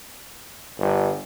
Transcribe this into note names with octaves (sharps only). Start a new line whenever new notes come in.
G1